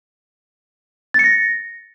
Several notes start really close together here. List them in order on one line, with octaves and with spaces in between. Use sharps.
A6 C#7 A#6